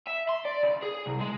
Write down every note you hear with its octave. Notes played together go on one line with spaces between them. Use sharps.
E5
C6
D5
C#3
G#4
C2
G#3